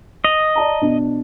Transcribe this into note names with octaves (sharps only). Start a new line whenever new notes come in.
D#5 F7
D5 A5 A#5
B2 D4